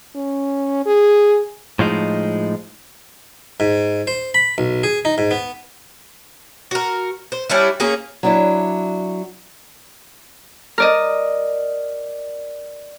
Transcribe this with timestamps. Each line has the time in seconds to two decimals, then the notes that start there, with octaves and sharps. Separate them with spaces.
0.16 C#4
0.86 G#4
1.79 A2 F3 G#3 D#4
3.60 G#2
4.07 C5
4.34 B5
4.58 B1
4.83 G#4
5.05 D#4
5.18 G#2
5.31 B3
6.71 F#4 A#4
7.32 C5
7.50 G3 C#4 D4 E4
7.80 A#3 C#4 G#4
8.23 F#3 D4 E4
10.78 A#4 D5 D#5